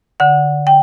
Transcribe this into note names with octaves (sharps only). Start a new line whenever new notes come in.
D3 F#5
G5